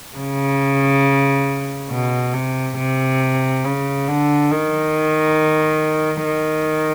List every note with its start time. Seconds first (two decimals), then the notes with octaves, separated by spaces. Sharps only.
0.17 C#3
1.91 B2
2.34 C3
2.78 C3
3.65 C#3
4.08 D3
4.51 D#3
6.25 D#3